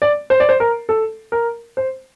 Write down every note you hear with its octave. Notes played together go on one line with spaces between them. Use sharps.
D5
C5
D5
C5
A#4
A4
A#4
C5